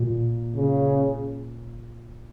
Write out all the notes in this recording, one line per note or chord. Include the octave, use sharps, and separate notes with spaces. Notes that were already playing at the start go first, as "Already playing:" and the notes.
Already playing: A#2
C#3